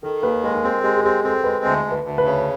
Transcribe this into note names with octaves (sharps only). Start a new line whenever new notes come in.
D#3 A4
D#2 B4
G#3 A#4
C4 G#4
G#3 G4
G#4
C4 G4
C4 A4
G#3 B4
D2
D2
B4
D2
B4
C#3